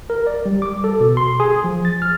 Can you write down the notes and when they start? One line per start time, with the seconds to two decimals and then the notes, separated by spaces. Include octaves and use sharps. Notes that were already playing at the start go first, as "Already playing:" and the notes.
0.10 A#4
0.27 D5
0.46 G3
0.62 D6
0.84 A4
1.00 B2
1.17 C6
1.40 G#4
1.64 F3
1.85 A6
2.02 F6